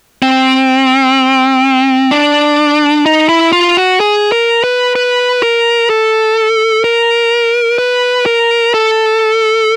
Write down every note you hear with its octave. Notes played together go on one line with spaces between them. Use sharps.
C4
D4
D#4
E4
F4
F#4
G#4
A#4
B4
B4
A#4
A4
A#4
B4
A#4
A4